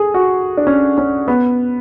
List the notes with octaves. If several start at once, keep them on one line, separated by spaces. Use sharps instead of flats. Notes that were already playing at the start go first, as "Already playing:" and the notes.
Already playing: G#4 A4
F#4
D4
C#4
C#4
B3